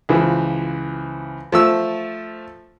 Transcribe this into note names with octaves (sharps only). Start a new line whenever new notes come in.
C#2 E3 F3
F3 A3 E6